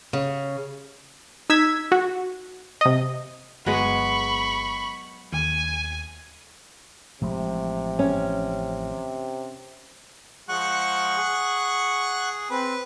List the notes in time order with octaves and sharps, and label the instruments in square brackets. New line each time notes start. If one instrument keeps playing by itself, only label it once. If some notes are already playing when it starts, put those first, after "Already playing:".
[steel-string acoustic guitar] C#3
[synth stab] D#4 E6 G#6 B6
F#4
C3 D#5
[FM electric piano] G1 [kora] F#3 G#3 B3 [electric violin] B5 C#6
[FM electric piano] D#2 [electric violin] G#5
[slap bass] A1 F3 G#3 [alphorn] C3
[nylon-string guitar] C#4
[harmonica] F3 G#3 [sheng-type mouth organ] F#5 C#6 F#6
[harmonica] G#4
[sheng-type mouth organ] C4 [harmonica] B4